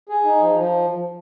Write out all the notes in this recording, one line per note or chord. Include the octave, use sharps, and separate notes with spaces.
G#4
D#4
F3
F3